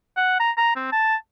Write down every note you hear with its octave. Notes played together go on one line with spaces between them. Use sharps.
F#5
A#5
A#5
C4
A5